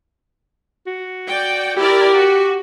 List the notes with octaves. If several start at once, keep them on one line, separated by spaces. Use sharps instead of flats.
F#4
D5 G5
E4 G4 A#4 D5
F#4